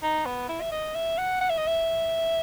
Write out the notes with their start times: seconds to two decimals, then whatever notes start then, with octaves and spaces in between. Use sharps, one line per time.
0.03 D#4
0.26 B3
0.49 E4
0.61 E5
0.71 D#5
0.95 E5
1.18 F#5
1.41 F#5
1.50 E5
1.58 D#5
1.67 E5